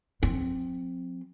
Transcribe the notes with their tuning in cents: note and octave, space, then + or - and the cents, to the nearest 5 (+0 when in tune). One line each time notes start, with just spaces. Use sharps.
F3 +40 C4 +5